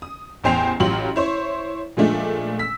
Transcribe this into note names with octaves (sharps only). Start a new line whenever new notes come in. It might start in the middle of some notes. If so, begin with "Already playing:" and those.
D#6
A1 E2 C5 G5 C7 F7
A1 F#3 F4 G4 C6 F#7
E4 C5 C#5
A#2 F3 G#3 A3 D4
E6 B6